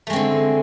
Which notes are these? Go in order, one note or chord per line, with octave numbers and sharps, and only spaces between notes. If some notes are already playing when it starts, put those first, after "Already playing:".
D3 G#3 A3 C4